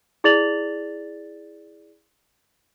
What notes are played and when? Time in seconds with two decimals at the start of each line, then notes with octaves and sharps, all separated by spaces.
0.24 E4 G#4 D5 A6 F7 F#7